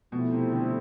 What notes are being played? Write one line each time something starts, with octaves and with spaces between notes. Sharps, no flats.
B2 F3 A3 C4 E4
C3
D3